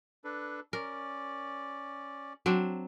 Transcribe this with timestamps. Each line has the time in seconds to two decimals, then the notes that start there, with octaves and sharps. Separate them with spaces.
0.24 D4 A4 B4
0.73 C#4 A#4 D5
2.46 F#3 C4 D4